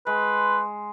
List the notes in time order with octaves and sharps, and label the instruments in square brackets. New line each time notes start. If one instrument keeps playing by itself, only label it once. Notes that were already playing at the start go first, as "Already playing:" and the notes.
[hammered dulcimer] G#3 [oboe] B4